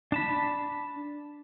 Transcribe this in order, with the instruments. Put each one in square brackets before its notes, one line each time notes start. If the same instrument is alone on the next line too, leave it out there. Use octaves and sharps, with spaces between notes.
[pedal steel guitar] D4 A5 B5